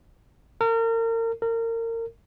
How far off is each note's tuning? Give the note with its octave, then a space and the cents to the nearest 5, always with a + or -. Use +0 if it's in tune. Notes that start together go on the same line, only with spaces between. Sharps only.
A#4 -35
A#4 -30